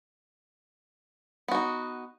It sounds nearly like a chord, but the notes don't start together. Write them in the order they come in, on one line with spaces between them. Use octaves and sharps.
B3 F#4 D#4